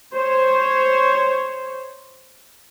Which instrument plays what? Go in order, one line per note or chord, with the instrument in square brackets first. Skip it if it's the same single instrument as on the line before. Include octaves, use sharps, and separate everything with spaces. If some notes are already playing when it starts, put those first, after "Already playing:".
[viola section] C5 C#5